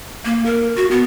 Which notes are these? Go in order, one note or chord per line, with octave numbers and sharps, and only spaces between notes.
A#3
A#4
F#4
B3